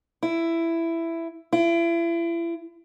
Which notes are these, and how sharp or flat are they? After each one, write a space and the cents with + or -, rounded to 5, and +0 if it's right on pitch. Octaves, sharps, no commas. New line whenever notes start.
E4 +10
E4 +35